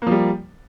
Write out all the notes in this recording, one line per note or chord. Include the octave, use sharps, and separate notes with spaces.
F3 G3 A#3